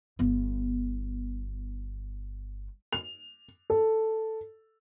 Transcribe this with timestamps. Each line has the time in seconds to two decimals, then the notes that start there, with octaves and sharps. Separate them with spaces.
0.19 G1 B3
2.93 F7
3.70 A4